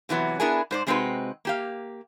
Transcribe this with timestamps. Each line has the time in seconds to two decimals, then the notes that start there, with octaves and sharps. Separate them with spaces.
0.09 C3 E3 F#3 B3
0.40 B3 D4 E4 G#4 A#4 G#5
0.71 G#2 C5 D5
0.87 C3 G#3 C4 D#4 F#4 B4
1.45 A#3 G4 F5